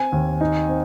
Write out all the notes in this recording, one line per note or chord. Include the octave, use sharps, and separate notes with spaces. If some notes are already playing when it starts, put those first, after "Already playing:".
Already playing: C4 G#5
D#2
D#4
C4